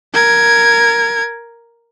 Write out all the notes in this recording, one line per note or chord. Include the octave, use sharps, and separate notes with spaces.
A#4 G#6